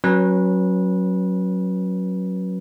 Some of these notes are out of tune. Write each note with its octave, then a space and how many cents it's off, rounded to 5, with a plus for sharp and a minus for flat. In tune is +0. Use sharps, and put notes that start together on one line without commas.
F#3 +0 C#4 -20 B4 -25